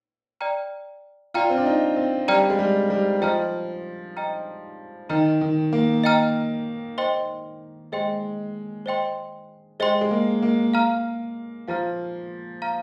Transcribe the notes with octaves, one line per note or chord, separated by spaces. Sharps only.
D5 G5 A#5 F6
F4 D5 G5 A#5 F6
C4
D4
D#4
C4
G3 D5 G5 A#5 F6
G#3
G3
G3
F3 D#5 G5 A#5 F6
D#5 G5 A#5 F6
D#3 D#5 G5 A#5 F6
D#3
A#3
D#5 G5 A#5 F6
C5 D#5 G5 C6
G#3 C5 D#5 G5 C6
C5 D#5 G5 C6
G#3 C5 D#5 G5 C6
G#3
A#3
A#3
F5 A#5 F6
F3 F5 A#5 F6
F5 A#5 F6